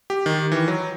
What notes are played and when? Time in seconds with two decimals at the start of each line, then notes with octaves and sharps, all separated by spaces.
0.10 G4
0.26 D#3
0.52 E3
0.68 F#3